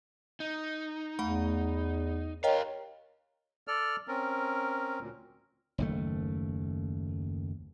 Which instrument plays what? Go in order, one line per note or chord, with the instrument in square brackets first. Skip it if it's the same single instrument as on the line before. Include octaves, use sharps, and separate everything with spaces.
[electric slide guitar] D#4
[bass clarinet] E2 [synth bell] A3 F#5 B5
[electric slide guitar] G4 F5 [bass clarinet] A#4 [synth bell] C#5 D#5 G5
[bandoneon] A4 D5 F6
C4 C#4 A#4
D2 A#2
[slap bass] F#1 D#2 A3